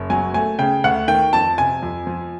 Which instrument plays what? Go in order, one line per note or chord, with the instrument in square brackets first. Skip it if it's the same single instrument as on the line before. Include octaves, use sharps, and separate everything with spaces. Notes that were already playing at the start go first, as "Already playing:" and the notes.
Already playing: [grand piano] F#1
[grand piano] F#3 [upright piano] G#5
[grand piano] A3 [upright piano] G#5
[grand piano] C#3 [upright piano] G5
[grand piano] D2 [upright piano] F#5
[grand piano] D#3 [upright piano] G5
[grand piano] F2 [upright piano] A5
[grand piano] C3 [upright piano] G#5
[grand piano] F2
F3